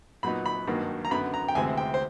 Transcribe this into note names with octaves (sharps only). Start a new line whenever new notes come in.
A#2 F#3 B3 D#4 B5
B5
G#1 G2 D#3 F#3 A#3
A#5
F#2 D3 F#3 B3 B5
A#5
G5
D2 C3 E3 G#3 C4 G#5
G5
C5